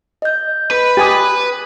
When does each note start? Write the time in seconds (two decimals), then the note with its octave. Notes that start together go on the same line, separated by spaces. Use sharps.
0.22 D#5 G6
0.71 B4
0.97 G4 G#5 D#6 A6